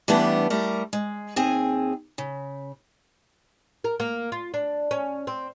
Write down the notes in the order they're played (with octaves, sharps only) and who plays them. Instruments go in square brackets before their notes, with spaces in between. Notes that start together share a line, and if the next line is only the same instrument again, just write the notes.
[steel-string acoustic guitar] E3 G3 A3 B3 D4
G3 A3 A#4
G#3
D#2 C4 G#4 G#5
C#3
[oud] A#4
A#3
F4
D4
C#4
C4